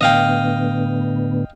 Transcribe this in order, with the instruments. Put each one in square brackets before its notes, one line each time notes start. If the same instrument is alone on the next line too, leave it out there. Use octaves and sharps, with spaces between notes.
[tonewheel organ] A2 D3 B3 [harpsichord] D#5 F5 G5